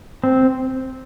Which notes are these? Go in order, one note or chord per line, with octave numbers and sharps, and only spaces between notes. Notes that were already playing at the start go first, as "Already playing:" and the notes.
C4